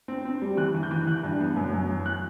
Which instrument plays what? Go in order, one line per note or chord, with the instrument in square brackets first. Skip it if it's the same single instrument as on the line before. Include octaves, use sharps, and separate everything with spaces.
[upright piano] C4
C4
G3
E3 F#6
E3
G6
E3
E3 F#6
G2
B3
F#2
F#2
E3
F#6